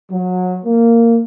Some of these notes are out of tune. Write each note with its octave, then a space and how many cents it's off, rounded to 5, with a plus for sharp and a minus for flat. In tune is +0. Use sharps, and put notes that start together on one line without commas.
F#3 -25
A#3 -10